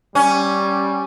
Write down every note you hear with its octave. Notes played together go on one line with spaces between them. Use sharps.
G3 C#4